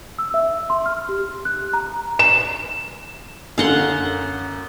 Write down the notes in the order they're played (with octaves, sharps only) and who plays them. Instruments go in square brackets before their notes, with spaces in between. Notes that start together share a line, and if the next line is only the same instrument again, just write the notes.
[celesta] E6
E5
C6
F6
G4
F#6
A#5
[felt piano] E7
[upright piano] F#2 D3 [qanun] F5 F#5 C6